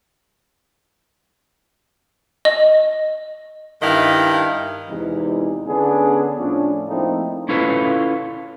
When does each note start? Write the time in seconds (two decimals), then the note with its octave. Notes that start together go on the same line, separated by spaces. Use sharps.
2.45 D#5
3.80 G2 D#3 E4 D#5 F5
4.89 E2 C3 E3 G#3 D#4
5.67 D3 B3 C#4 D4 G#4
6.38 A2 F3 C#4 D4
6.88 F3 A3 A#3 C4 D#4 E4
7.49 C#4 E4 F4 A4 B4